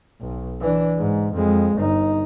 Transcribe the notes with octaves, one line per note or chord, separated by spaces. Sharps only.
B1
E3 D4
G#2
F2 G#3
G1 D#4